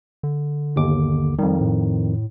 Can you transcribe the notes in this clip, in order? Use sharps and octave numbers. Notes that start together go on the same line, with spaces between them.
D3
G1 D#2 D6
F2 D#3 G3
A2